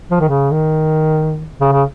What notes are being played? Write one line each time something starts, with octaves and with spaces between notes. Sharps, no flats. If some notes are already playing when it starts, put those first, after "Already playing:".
F3
D#3
C#3
D#3
C#3
C#3